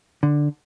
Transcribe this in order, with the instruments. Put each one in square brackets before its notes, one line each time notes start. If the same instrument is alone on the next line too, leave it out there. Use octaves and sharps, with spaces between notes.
[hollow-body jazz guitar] D3